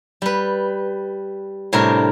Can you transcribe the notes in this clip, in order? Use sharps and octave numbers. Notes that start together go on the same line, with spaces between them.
G3 B4
A2 C3 G3 D4 A#4